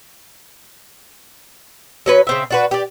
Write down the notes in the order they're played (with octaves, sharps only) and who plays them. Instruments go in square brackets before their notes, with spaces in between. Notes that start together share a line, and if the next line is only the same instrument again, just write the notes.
[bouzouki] F#3 C#4 B4
C#3 C4 E5
D4 F#4 B4
G4 D5